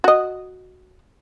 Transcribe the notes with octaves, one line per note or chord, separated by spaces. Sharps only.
F#4 D#5